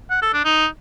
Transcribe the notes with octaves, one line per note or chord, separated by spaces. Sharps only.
F#5
A4
D4
D#4